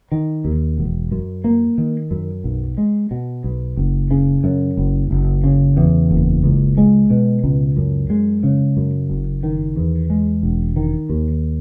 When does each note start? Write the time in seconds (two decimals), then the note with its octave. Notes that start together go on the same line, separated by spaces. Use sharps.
0.12 D#3
0.45 D#2
0.78 E1
1.11 F#2
1.44 A#3
1.78 D#3
2.11 F#2
2.44 B1
2.78 G#3
3.11 B2
3.44 B1
3.77 F#1
4.11 C#3
4.44 F#2
4.77 F#1
5.11 F#1
5.44 C#3
5.77 E2
6.11 F#1
6.44 C#2
6.78 G#3
7.10 B2
7.44 C#2
7.77 F#2
8.10 G#3
8.43 C#3
8.77 F#2
9.10 F#1
9.43 D#3
9.76 E2
10.10 G#3
10.43 E1
10.76 D#3
11.09 D#2